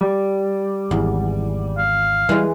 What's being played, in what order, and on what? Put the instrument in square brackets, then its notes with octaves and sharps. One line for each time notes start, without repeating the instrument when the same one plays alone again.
[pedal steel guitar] G3
[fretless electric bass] G#1 [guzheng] E2
[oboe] F5
[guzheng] E3 G#3 [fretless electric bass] G3